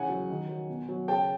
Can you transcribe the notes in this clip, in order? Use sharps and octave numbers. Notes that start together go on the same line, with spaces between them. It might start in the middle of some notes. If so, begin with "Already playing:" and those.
Already playing: C#3 E3 F#5 G#5
F#3
D#3
F#3
B2
F#3
C#3 G5 A5